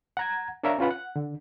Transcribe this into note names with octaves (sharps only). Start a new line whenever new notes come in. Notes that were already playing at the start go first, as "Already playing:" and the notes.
F#5 A#5 G#6
D4 A#4 C#5 E5 F5 A#5
C#4 F4 B4 F#5
F#5
D3